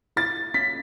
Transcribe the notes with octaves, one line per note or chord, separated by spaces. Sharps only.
E4 A6
C#4 B6